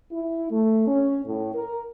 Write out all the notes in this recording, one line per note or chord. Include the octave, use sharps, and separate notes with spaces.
E4
A3
C#4
A2
A#4